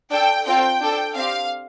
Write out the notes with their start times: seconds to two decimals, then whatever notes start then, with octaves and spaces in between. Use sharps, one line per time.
0.11 D4 A4 G5
0.46 C4 F4 A4 G5
0.81 D4 A4
1.15 C4 G4 F5